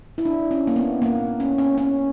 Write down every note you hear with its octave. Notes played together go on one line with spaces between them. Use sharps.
E4
D4
C#4
A#3
B3
A#3
C#4
C#4
C#4